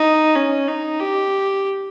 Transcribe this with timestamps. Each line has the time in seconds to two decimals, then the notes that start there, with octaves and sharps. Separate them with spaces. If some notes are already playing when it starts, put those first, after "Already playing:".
Already playing: D#4
0.35 C#4
0.68 D#4
1.00 G4